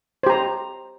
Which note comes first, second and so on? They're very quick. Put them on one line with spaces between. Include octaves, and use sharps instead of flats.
C5 G4 A#5